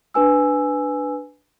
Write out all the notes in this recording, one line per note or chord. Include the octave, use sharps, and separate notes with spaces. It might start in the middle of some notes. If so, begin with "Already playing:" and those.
D4 B4 G#5 E6